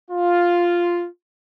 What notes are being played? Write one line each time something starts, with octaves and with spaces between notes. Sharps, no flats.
F4